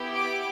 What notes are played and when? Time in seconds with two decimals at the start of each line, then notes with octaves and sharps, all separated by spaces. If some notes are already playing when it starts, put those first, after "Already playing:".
Already playing: B3 E4 G4
0.15 D6